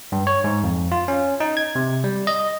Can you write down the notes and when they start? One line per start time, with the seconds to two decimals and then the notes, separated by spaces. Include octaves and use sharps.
0.12 G2
0.27 C#5
0.44 G#2
0.64 F2
0.92 F4
1.08 C#4
1.40 D#4
1.57 G#6
1.75 C3
2.04 G3
2.27 D#5